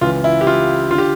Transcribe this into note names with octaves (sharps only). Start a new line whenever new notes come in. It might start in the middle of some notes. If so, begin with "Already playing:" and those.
C#2 C#3 E3 F4
E4
G4
F4
D3 F4
G4